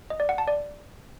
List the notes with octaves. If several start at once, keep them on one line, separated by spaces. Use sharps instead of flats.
D#5
D5
F#5
A5
D5